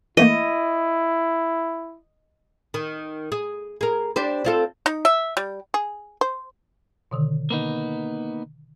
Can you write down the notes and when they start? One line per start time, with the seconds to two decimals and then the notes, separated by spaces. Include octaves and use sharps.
0.17 E3 A3 A#3 E4 D#5
2.74 D#3
3.32 G#4
3.81 G#4 A#4
4.16 D4 G4 C5
4.45 C4 F4 A4
4.86 D#4
5.05 E5
5.37 G3
5.74 G#4
6.21 C5
7.11 B2 D3 D#3
7.50 A#3 B3 D#4